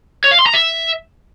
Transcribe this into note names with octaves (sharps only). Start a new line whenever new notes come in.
C#5
F5
C6
A#5
E5